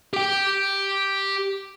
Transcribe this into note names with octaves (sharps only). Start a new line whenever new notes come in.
G4 G5